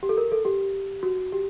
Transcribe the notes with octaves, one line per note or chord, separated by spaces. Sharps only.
G4
A4
A#4
A4
G4
F#4
G4